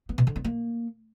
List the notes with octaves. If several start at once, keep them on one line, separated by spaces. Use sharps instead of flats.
B3
B2
D3
B3
A#3